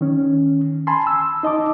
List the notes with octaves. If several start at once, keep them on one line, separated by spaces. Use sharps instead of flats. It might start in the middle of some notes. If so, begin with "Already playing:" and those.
D#3 C#4
G#5 A5 B5 C6
E6
D#4 D#5 A5 D6